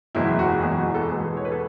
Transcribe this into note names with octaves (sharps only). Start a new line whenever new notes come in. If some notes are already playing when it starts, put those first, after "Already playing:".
F#1 E2 B2 G#3 E4
F#4
G#4
F#4
F#1 E2 B2 G#3 G#4
F#4
A4
E2 B2 G#3 B3 G#4
C#5
B4
A4